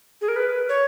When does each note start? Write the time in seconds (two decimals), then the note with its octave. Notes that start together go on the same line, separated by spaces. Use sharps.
0.21 G#4
0.28 A#4
0.36 B4
0.69 C#5